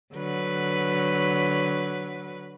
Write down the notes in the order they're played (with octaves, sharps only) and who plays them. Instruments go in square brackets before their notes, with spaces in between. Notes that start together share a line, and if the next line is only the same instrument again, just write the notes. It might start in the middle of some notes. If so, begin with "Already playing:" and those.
[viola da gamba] D3 F#3 B4